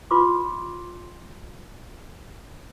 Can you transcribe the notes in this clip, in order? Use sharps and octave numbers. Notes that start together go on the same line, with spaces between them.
F4 B4 C6 D6